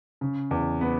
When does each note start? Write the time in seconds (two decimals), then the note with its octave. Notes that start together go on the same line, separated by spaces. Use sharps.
0.21 C#3
0.51 E2
0.81 B3